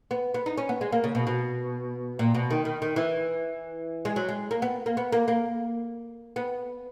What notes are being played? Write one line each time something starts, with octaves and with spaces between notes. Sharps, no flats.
B3
B3
D#4
C#4
B3
G#3
A#3
C#3
B2
B2
A#2
B2
D#3
D#3
D#3
E3
G#3
F#3
G#3
A#3
B3
A#3
B3
A#3
A#3
B3